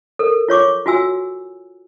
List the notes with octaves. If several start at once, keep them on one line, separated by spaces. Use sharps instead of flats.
A4 A#4
F4 C#5 C#6 D6
F4 F#4 G#5 E6